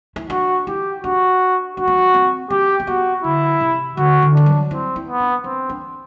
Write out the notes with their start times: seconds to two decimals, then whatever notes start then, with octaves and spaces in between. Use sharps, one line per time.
0.16 E4
0.30 D4 F#4
0.67 E4 G4
1.03 D4 F#4
1.77 D4 F#4
1.87 C4
1.98 D4
2.14 C4
2.50 C4 G4
2.80 C4
2.87 B3 F#4
3.24 D3 E4
3.60 C3
3.97 D3 F#4
4.22 D3
4.34 E3 D4
4.46 F#3
4.71 C4 E4
4.96 E4
5.08 B3
5.20 D4
5.44 C4 D4
5.69 D4